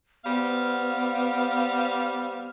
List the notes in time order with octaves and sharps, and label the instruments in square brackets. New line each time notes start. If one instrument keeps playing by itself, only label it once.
[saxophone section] G3 C4 F5 [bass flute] B3